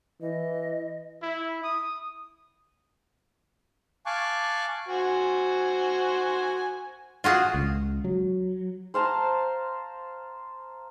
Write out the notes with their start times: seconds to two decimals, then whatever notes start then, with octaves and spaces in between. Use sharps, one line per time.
0.22 E3 D#5
1.22 E4
1.64 D#6
4.06 F5 G#5 A5 C#6 D6 F#6
4.88 F#4 C5 G#5
7.24 F4 F#4 G#4
7.54 C#2
8.04 F#3
8.94 C5 F5 A5 A#5